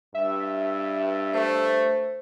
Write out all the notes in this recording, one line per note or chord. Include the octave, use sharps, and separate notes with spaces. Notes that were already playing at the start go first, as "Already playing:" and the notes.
G2 E5
A3 C5